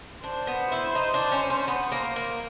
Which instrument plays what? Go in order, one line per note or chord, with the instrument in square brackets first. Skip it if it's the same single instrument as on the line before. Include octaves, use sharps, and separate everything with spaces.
[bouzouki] D4 [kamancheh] C5
[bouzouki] B3
E4
D#4
D4
C#4
C#4
B3
A#3
A#3